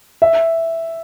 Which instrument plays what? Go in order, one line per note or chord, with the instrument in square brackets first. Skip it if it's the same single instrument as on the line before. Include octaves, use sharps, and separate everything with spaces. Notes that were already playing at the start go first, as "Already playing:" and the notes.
[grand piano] E5